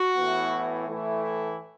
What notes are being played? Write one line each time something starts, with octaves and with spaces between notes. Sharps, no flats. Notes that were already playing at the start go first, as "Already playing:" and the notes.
Already playing: F#4
A2 E3 B3
A2 E3 A3 E4
E4